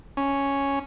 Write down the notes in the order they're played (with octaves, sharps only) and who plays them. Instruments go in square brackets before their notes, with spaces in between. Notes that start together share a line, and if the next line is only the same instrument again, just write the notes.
[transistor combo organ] C#4